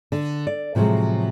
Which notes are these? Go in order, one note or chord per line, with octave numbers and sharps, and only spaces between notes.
D3
D5
A2 C3 F3 F#3 G#3